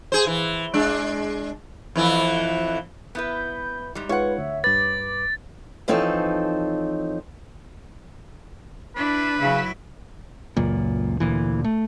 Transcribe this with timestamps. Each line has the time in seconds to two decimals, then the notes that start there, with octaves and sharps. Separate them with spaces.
0.12 G#4 C5
0.27 E3
0.74 G#3 D4
1.95 F2 E3 E4
3.15 B3 E4 B4 G6
3.95 G#2 G3
4.09 G#3 D#4 F4 B4 C#5 F#5
4.38 D2 E5
4.64 G2 B4 D6 A6
5.88 E3 F3 C4 D#4 A4 C#5
8.95 D4 E4 B4
9.38 C#3 F#3 E4
10.57 C#2 F#2 A#2
11.20 D2 A#2 E3
11.64 A3